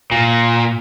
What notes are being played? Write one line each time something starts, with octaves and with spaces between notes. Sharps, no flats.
A#2